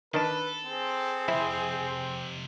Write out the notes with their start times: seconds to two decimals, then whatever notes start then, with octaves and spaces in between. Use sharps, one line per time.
0.14 D#3 D4 A4 B4 A5
0.65 C4 G#4
1.28 F2 C3 E4 C5